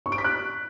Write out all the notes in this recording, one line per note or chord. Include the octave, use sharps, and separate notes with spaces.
C#6
D7
B6
F#6